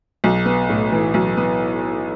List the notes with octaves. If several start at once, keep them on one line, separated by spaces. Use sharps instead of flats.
B1
B3
A2
E3
B1
B3